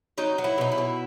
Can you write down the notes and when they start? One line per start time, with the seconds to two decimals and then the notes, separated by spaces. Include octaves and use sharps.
0.18 F#3 D#4
0.38 F#3
0.44 E4
0.58 B2 D#4
0.72 E4
0.78 B2